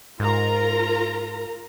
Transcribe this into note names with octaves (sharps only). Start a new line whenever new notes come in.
G#2 F4 A#4 A#5